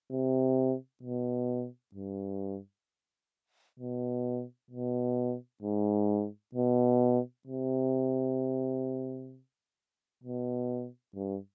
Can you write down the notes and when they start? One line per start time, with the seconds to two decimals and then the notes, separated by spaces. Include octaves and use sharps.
0.11 C3
1.03 B2
1.95 G2
3.79 B2
4.71 B2
5.63 G#2
6.55 B2
7.47 C3
10.24 B2
11.15 G2